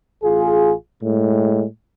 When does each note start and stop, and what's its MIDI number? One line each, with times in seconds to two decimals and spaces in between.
0.24 0.73 33
0.24 0.73 65
0.24 0.73 68
1.02 1.65 45
1.02 1.65 56